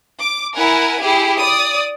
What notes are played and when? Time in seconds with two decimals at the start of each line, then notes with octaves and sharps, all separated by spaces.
0.20 D6
0.57 E4 A#4 F#5 G#5
1.00 E4 G4 G#4
1.38 D5 D#6